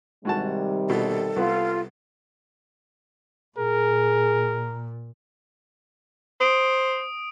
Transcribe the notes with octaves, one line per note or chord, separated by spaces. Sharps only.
G#2 C3 D#3 G3 F#4 A5
B2 A4
C2 B3 F4
A#2 G#4 A#4
C5 D#6 D7